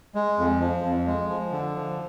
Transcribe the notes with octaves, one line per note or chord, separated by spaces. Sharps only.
G#3
F2
F3
F2
G#3
F3
D3
F3